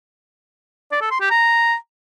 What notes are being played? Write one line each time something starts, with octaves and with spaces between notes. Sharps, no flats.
D5
A4
C6
G4
A#5